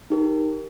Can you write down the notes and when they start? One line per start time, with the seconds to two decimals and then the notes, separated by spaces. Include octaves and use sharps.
0.10 D#4 G4 A#4